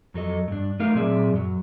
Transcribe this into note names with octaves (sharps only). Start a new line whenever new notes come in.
F2 F#3 A4 D#5
G2 D4
A3 D#4 A#4 F5
A#2 F#3 C4 G#4 D5 E5
F#2 F#3